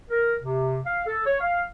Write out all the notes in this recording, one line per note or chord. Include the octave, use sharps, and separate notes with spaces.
A#4
C3
F5
A4
C#5
F5